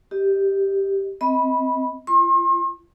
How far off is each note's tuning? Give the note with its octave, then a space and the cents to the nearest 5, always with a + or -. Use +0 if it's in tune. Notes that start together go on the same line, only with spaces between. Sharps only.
G4 +0 D#5 +0
C4 +0 D#5 +30 B5 -15
F4 -45 C6 +40